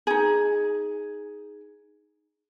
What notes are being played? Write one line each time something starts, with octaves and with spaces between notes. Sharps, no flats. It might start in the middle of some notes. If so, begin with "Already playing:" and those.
D#4 G#4